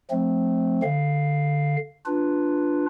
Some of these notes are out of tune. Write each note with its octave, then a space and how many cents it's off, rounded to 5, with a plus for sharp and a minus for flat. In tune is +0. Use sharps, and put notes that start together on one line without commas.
F3 +15 A3 -5 C4 +0
D3 +10 F5 +0
D4 +0 F4 +0 B4 +0